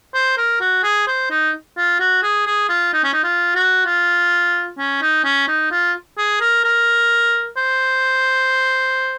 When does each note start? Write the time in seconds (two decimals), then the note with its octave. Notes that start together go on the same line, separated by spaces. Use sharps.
0.14 C5
0.38 A#4
0.61 F#4
0.83 G#4
1.07 C5
1.30 D#4
1.77 F4
2.00 F#4
2.23 G#4
2.46 G#4
2.69 F4
2.93 D#4
3.04 C#4
3.13 D#4
3.24 F4
3.55 F#4
3.86 F4
4.78 C#4
5.02 D#4
5.24 C#4
5.48 D#4
5.71 F4
6.18 G#4
6.41 A#4
6.64 A#4
7.57 C5